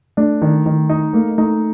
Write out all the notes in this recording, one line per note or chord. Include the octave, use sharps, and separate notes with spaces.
A3 D4
D#3
D#3
D#4
A3 A#3
A3 D#4